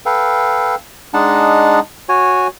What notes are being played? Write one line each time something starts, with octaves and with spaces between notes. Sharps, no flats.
A4 B4 F5 G5
G#3 D4 D#4 F#5 A5
F#4 C#5 G#5